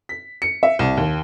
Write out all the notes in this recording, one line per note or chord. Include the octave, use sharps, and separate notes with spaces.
B6
C#7
E5
C2
D#2